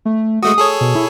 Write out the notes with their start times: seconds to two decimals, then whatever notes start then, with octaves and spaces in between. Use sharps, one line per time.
0.05 A3
0.43 G#3 A3 F#4 D#6
0.58 G#4 A4 C#5
0.81 B2
0.95 E4